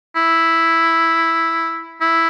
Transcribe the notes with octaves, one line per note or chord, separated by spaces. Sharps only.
E4
E4